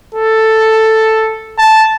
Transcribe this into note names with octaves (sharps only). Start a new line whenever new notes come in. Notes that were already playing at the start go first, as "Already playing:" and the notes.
A4
A5